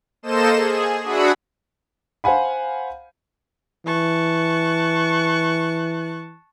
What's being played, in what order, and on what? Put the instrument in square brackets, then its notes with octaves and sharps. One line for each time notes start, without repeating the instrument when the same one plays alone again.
[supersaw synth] A#3 A4 C5 D#5 E7
G#4
D4 F#4 G#4 E5 F#5 B5
[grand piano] C5 F5 F#5 G#5 B5
[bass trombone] E3 [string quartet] A5 C#6 F#6